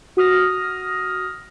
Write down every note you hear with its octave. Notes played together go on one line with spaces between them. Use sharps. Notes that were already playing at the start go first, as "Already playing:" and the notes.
F#4 D#6 F6 A#6